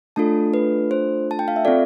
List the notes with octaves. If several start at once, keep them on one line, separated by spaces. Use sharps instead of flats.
A3 D4 F4 A4 A5
B4
C5
A5
G5
F5
E5
C4 F4 A4 D5